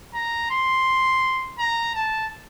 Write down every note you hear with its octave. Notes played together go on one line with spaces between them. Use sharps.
A#5
C6
A#5
A5